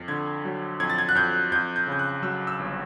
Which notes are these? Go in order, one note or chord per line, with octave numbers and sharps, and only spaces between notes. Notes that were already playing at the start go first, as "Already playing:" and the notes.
Already playing: F2
D3 G#6
F#3
F2 G#6
A6
G#6
F#6
F2 G6
F2 G6
G6
C#3
G6
F#6
F#3 E6
E6
G1